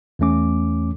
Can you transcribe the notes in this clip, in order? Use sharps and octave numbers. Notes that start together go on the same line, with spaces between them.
E2 E3 A3 C#4 D6